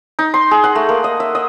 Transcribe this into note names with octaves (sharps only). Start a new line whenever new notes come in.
D#4
C6
G#4
F#5
A3
A#3
D#5
E5
D#5